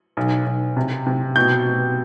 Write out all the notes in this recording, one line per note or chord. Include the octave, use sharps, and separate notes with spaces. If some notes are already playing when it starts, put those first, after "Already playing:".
B1
B1
C3
C3
B2 G6
B2